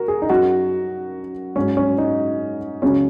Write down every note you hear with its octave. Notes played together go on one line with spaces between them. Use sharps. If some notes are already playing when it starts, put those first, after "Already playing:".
Already playing: F#4 A#4
G#4
D#4
F#2 F#3 F#4
G#2 F#3 C#4
C#4
D#4
C#2 C#3 F#3 C#4